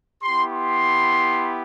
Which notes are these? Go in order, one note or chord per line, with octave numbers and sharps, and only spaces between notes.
B3 E4 G4 C6
C6